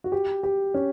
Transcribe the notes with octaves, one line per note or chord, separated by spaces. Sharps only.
F#4
G4
G4
C#4